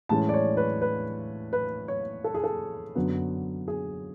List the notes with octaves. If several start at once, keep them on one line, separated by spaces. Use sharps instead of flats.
A2 E3 G#3 C#4 A5
D5
C#5
B4
B4
B4
C#5
A4
G#4
A4
F#2 D3 F#3 B3
G#4